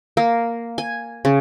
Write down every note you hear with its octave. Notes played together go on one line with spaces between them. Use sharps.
A#3
G#5
C#3